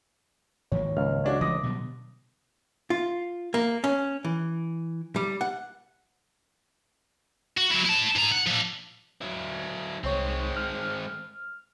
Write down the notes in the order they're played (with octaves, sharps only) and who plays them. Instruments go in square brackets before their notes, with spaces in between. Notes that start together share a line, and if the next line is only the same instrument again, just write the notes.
[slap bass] G#2 D#3 A#3 [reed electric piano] F3 C#5
[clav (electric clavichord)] C#2 [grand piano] F6
[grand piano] C#4 D4 F#4
[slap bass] E3 G#3 A3 [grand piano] D6 D#6 A#6
[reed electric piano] B2 [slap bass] D3 F#3 G3
[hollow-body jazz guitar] F4
A#3
C#4
E3
G3
F#5
[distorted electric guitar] F#4
F#3 E4
E4 A5
G#2 A#5
F#5
F3 D4
[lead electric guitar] F#3 E4
[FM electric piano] C2 C#5 [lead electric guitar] G#3 C4
[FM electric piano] F6